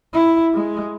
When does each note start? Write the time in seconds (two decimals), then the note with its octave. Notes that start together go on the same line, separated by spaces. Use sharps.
0.14 E4
0.54 G#3